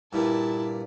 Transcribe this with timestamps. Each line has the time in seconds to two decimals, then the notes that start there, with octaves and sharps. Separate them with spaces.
0.13 G2 A#2 E4 A5